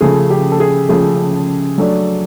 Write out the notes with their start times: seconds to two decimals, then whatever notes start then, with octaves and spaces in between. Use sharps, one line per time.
0.01 C#3 F3 A3 G#4
0.30 G4
0.52 A4
0.60 G#4
0.89 C#3 F3 A3 G#4
1.78 F#3 A3 D4